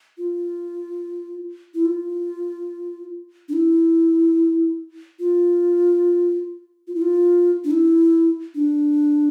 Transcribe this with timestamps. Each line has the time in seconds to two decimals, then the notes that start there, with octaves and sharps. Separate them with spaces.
0.18 F4
1.74 E4
1.86 F4
3.49 D4
3.53 E4
5.20 F4
6.88 F4
6.95 E4
7.02 F4
7.64 D4
7.71 E4
8.55 D4